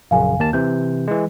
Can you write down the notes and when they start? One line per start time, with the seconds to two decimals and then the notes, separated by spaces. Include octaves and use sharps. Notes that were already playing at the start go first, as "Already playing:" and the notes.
0.11 A#1 F#2 C#3 F5 G#5
0.39 D#2 A#3 A5
0.53 C3 E3 G6
1.08 E3 G#3